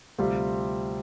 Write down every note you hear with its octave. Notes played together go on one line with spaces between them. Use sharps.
D2 C3 G3 C4 F4